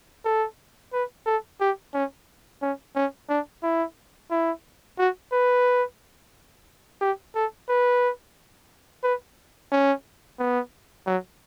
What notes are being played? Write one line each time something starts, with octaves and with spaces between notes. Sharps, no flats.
A4
B4
A4
G4
C#4
C#4
C#4
D4
E4
E4
F#4
B4
G4
A4
B4
B4
C#4
B3
F#3